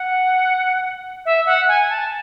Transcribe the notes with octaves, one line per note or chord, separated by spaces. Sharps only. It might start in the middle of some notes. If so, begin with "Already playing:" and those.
Already playing: F#5
E5
F#5
G#5
A5